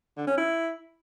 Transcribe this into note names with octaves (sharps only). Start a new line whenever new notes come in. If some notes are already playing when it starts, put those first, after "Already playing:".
D3
C#4
E4